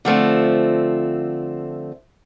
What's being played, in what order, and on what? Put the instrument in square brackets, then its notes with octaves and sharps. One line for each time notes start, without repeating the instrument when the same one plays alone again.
[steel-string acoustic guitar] D3 F3 A3 C4